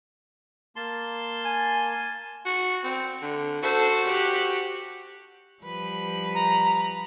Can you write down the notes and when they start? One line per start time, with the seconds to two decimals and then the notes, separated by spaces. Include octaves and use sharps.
0.76 A#3 A5 C6
1.45 G#5
2.45 F#4
2.84 C4
3.22 D3
3.62 F#4 A4 C5
4.06 G4 F#6
5.63 F3 G3 B4
6.35 A#5